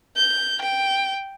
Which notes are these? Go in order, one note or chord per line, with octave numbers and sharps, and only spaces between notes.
G6
G5